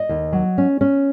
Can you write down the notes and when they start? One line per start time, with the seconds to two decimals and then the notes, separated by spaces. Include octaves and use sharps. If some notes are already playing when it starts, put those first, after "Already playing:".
Already playing: D#5
0.09 D#2
0.33 F#3
0.58 C#4
0.81 C#4